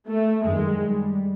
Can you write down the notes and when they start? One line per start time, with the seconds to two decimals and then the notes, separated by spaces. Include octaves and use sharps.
0.08 A3
0.43 F#2 D#3 G3 G#3
0.80 G3